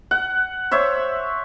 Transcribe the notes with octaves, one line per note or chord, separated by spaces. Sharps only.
F#5
C5 C#5 E5 E6